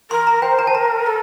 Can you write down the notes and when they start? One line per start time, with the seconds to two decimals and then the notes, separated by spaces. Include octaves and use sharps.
0.10 A#4 C6
0.27 A#5
0.42 C5 G5
0.59 A#5
0.67 A5
0.75 A#4 A#5
1.06 A4